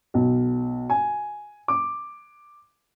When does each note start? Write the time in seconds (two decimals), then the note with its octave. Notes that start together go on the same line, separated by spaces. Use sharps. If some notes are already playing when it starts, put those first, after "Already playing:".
0.14 B1
0.90 G#5
1.68 D6